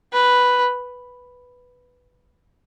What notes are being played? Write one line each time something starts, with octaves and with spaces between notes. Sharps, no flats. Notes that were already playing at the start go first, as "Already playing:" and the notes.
B4